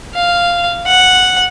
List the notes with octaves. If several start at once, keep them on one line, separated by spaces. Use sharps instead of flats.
F5
F#5